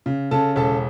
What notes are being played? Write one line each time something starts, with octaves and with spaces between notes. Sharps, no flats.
C#3
C#3 A4 A5
E1 A4 A5